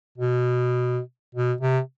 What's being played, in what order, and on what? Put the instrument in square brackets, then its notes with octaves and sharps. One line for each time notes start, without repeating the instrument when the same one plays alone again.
[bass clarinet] B2
B2
C3